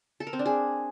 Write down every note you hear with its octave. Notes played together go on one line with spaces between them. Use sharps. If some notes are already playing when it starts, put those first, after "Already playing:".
A4
A#4
C4
D4
G#4